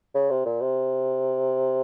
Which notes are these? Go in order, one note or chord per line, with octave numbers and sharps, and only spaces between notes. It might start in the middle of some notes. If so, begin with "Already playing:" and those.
C#3
C3
A#2
C3